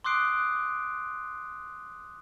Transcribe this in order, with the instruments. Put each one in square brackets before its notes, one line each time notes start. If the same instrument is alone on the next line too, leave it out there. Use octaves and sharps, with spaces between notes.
[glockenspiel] C6 D6 D#6 F#6 C7 D7